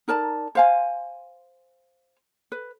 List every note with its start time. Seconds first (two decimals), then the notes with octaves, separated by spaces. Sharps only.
0.08 D#4 A#4 D5 A5
0.55 C5 F5 G#5
2.52 B4